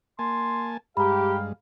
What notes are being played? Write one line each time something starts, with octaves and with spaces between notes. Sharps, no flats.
A#3 G#5 A5 C6
G2 G#3 G4 F5 A#5 B5